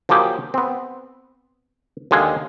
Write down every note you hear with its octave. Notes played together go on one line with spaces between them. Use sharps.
F3 F#3 A#3 G4 G#4
B3 C4
D#2 D3 G#3 G#4 F5